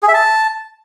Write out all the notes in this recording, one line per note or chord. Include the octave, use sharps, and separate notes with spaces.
G#4
E5
A5